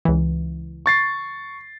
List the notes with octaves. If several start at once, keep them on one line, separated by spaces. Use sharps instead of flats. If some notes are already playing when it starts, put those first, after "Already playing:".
C#2 E3
C#6 A6 C7